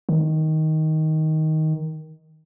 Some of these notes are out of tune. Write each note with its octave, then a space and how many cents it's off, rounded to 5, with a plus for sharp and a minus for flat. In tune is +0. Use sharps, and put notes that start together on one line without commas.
D#3 +10